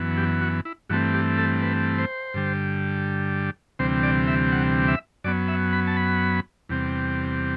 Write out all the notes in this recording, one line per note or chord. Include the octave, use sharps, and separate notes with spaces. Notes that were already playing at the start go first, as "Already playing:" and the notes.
Already playing: F#2 E3 B3
G4
F#4
E4
G2 E3 A3 C4 F#4
G4
A4
B4
C5
G2 D3 G3
D2 C3 E3 G3 C4 C5
D5
E5
F#5
E5
F#2 F#3 B3 D5
E5
B5
A5
B5
E2 C3 G3 C4